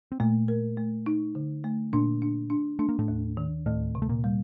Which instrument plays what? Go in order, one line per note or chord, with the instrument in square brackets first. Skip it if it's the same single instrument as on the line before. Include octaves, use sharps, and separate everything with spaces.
[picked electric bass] C4
[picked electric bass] A#2 A#3 [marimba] A3
[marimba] A#4
A3
D#4
D3
A3
[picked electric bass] A#2 A#3 [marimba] D4
[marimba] D4
D4
[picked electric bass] A3 [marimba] D4
[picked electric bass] A#3
A2 A3
[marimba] D#2
D#3
[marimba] D2 [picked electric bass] A2 A3
[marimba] C3
[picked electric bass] A3
A#2 A#3
[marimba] G3